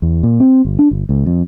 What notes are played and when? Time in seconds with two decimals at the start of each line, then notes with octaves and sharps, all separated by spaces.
0.02 E2
0.23 A#2
0.40 C4
0.65 G1
0.79 D4
0.91 G1
1.09 C#2
1.26 F2